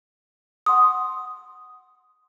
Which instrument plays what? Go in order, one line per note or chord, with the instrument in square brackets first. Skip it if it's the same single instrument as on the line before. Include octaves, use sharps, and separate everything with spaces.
[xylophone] F#5 C6 D#6